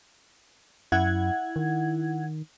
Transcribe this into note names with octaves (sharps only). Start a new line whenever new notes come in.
F#2 E4 F#5 G#6
D#3